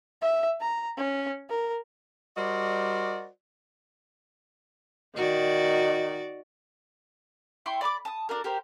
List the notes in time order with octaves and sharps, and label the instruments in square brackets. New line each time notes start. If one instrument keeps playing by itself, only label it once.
[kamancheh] E5
A#5
C#4
A#4
[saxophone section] G3 F#4 A#4 C5 D5 D#5
[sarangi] D#3 [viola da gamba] F#4 D5
[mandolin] E4 G5 C6 C#6
D5 B5 C#6 D6
A5 D#6
D4 F#4 A#4
G4 A#4 C5